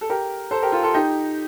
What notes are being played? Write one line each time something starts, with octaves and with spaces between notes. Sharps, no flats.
A4
G4 A#4
A4 C5
G4 A#4
F4 A4
F4 A4
D#4 G4